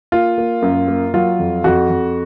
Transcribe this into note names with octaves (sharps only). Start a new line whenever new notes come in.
A#3 F4
A#3
F#2
A#3
F#3 F4
F2
F2 F#4
F2